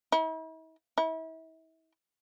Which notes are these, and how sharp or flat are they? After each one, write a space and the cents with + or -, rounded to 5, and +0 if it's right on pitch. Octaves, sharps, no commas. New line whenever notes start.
E4 -45
E4 -35